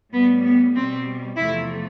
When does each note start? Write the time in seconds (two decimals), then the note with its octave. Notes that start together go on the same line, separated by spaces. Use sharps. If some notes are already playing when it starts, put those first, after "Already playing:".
0.13 A2 G3 B3
0.44 B3
0.75 B2 G3 C4
1.37 E2 C3 F3 A3 E4